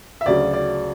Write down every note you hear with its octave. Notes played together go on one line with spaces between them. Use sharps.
E5
D2 C#3 F#3 D5
D5